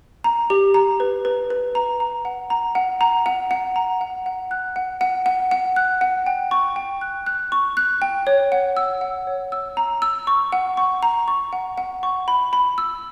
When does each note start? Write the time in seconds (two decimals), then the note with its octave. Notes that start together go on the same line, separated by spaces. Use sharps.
0.24 A#5
0.50 G4
0.74 A#5
1.00 B4
1.25 B4
1.50 B4
1.75 A#5
2.00 A#5
2.25 F#5
2.50 A#5
2.75 F#5
3.01 A#5
3.26 F#5
3.51 F#5
3.76 A#5
4.01 F#5
4.26 F#5
4.51 F#6
4.76 F#5
5.01 F#5
5.26 F#5
5.51 F#5
5.76 F#6
6.01 F#5
6.27 G5
6.51 C#6
6.76 G5
7.01 F#6
7.26 F#6
7.52 C#6
7.77 F#6
8.02 G5
8.27 C#5
8.52 F#5
8.77 E6
9.01 F#5
9.27 C#5
9.52 E6
9.77 A#5
10.02 E6
10.27 C#6
10.52 F#5
10.77 C#6
11.03 A#5
11.28 C#6
11.53 F#5
11.78 F#5
12.03 C#6
12.28 B5
12.53 B5
12.78 E6